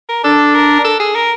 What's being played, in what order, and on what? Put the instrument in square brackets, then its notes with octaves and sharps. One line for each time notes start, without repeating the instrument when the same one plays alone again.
[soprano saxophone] A#4
[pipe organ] D4 [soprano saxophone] A4
[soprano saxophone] A#4
A4
G#4
A#4